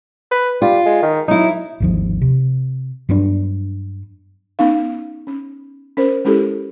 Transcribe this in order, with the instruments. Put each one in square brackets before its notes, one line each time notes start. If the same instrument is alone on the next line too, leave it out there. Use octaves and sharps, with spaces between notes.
[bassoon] B4
[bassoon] G3 [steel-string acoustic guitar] F4
[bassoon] G#3
D#3
[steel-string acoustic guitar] F#3 E4 [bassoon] D#4
[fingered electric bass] G#1 D#2 F3
C3
G2 F#3 B3 D4
[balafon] B3 C#4 D#4 F5
C#4
C#4 A#4 C5
G#3 C#4 E4 G4 A4